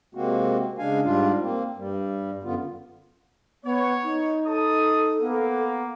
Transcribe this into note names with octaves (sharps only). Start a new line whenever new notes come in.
C3 G#3 A#3 C4 F#4
C#3 G#3 D4 F5 G#5
G#2 G3 D4 F4
A#3 C4
G2 G3
F#2 D3 B3 F4
B3 C#5
D#4
A4 A5 D#6
A#3 B3